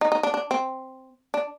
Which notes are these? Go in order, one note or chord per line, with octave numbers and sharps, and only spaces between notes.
D#4
D#4
D4
D4
C4
D4